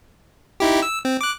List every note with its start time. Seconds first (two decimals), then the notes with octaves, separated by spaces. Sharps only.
0.60 D#4 E4 G4
0.82 E6
1.05 C4
1.21 D6 F#6